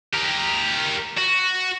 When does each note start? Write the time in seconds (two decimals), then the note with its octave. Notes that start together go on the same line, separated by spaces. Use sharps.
0.13 G4 A#4
1.18 F#4